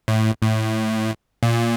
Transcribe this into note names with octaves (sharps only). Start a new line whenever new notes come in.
A2
A2
A#2